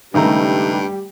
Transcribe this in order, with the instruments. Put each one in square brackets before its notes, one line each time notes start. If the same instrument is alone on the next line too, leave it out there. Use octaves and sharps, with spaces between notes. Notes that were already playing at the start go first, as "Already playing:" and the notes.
[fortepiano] C#2 A3 A#5 [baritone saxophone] G2 [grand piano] D#3 D#4 [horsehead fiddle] G3 G4